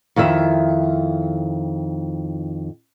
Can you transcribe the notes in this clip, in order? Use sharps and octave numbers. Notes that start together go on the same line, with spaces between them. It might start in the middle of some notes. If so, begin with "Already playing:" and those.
F2 D#3 E4 E5